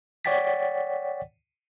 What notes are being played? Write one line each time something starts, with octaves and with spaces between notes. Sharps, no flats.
C#5 D5 F#5 G5 A6 B6